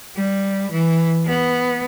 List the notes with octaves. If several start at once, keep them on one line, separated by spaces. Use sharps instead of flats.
G3
E3
B3